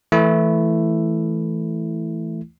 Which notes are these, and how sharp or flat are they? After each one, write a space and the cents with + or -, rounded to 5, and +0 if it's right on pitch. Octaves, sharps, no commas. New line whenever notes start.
E3 +0 A3 +0 E4 +5